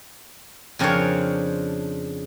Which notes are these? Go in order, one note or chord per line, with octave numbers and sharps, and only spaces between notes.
F2 C#3 D4 A#4 C5 C#5